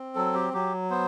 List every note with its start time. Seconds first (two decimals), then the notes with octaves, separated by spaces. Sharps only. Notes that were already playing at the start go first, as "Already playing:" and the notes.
Already playing: C4
0.15 F#3 A4
0.34 G4
0.53 F#3 G4
0.90 B3 C5